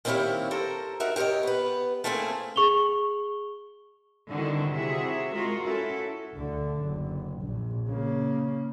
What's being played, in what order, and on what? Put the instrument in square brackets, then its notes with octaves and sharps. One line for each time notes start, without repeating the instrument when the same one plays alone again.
[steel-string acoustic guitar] D#3 A#3 C4 E4 G4 C#5
A4 A#4 C5 A#5
D#4 F#4 A#4 E5
G4 A#4 B4 C#5 D#5
B3 B4
A3 A#3 C4 C#4 E4 G#4
[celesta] G#4 C#6 F7 G7
[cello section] D3 D#3 G3 C4 E4 F#4
C3 E4 F#4 G#4 E5
G#3 F4 F#4 A#4
C#4 E4 F#4 A4
[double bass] D2 D3
F#1
A#1
C#3 A#3